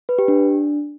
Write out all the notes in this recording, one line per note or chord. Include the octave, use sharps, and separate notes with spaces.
B4
G4
D4